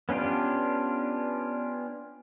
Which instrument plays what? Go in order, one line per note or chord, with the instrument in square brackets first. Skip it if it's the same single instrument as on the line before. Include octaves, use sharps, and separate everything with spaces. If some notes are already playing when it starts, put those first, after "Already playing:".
[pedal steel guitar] B3 C#4 D4 F4 G4